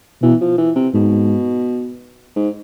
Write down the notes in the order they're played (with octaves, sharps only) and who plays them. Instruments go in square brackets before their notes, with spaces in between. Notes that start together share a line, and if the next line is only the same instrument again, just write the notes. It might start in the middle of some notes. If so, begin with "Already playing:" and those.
[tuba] B2 [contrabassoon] E3
[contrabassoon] F3
E3
C3
[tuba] G#2 [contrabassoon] B2
[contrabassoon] G#2